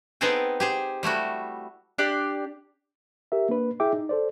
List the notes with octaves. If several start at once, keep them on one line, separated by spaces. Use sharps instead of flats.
B3 C4 D#4 G#4 A4 G5
G4 G#4 C5
G3 A3 E4 F#4
D4 G4 D5
G4 A#4 E5
A#3 D4 B4
E4 G#4 E5 G5 D6
D#4
A4 C5 D5